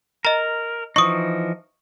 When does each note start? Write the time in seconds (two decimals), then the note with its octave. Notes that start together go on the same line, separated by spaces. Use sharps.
0.25 A#4 D#5 A#5
0.96 E3 F3 D#4 C#6 D#6